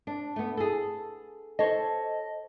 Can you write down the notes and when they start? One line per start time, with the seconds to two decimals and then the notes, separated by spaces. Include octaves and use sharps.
0.07 D4
0.36 A3 B3
0.57 G#4 A4
1.59 A4 C5 C#5 D#5